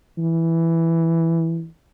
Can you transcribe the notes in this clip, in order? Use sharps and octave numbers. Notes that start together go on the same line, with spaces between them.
E3